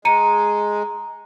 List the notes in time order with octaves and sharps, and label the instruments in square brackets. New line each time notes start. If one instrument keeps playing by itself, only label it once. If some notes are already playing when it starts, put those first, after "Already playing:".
[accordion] G#3 [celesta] A#5 C#7 D#7